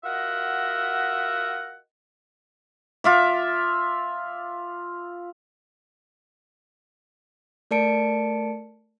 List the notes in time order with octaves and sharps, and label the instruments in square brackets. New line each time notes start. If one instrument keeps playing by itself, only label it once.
[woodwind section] F4 F#4 A#4 D#5 E5 F#5
[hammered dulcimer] F4 E5 D6
[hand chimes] A3 A#4 D5 A5 C#7 D7